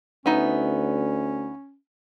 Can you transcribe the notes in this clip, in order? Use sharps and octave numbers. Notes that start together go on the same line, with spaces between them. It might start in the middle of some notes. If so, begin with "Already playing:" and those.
D2 B3 C#4 D#4 E5